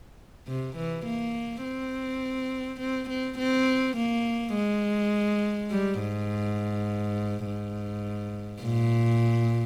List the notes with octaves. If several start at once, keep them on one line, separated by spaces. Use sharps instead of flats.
C3
E3
A#3
C4
C4
C4
C4
A#3
G#3
G3
G#2
G#2
A#2